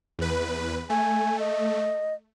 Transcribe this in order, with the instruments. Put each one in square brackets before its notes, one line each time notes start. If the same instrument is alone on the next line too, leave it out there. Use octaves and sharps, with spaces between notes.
[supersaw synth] E2 B4
[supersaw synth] A3 [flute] G#5
[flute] D#5